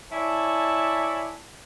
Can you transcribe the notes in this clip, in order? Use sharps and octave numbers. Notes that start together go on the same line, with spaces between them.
E4 C#5 D5 G#5 A5